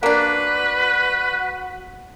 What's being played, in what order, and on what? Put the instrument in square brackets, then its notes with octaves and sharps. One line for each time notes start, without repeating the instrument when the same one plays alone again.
[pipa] A#3 D4 [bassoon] F#4 [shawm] B4